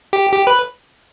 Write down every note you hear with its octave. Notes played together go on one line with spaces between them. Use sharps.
G4
G4
B4